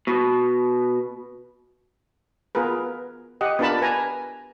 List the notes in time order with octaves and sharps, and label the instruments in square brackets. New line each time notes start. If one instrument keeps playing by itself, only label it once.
[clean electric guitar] B2
[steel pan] B3 F4 G#4 A#4 B4
G4 D#5 F#5
B3 D4 F4 A#4 A5 B5
B4 G#5 A#5